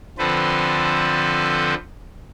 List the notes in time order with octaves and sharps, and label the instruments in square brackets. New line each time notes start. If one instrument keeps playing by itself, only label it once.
[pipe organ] D3 F3 C4 A4 B4 C5